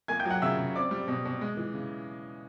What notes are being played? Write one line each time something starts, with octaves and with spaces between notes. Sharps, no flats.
A#3 G#5 G#6
G5 G6
F#3 F#5 F#6
C#3 E5 E6
C#3
C4 D5 D6
G3
B2
B2
G#3
E3
C#3